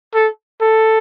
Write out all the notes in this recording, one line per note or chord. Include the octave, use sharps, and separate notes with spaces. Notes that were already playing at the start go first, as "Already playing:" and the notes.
A4
A4